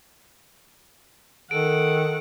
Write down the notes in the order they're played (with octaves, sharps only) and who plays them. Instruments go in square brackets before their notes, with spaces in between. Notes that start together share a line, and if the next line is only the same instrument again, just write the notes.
[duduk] D#3 [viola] A4 F#5 [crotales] D7